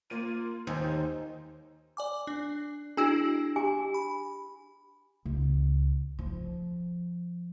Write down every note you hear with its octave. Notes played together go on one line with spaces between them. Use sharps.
A#3 F4 D#7
D#2 D#4 C5 G#5
D5 G#5 D6
D4
D4 E4 F#4 G#4 E6
G4 G#5 D6
B5
C#2
F3